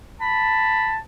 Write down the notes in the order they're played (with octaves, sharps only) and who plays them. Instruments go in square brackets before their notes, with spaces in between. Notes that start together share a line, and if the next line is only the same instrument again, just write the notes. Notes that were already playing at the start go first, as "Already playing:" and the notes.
[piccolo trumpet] A5 [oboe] B5